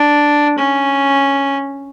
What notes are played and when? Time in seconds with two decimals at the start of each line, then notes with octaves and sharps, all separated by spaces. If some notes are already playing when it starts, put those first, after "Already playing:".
Already playing: D4
0.58 C#4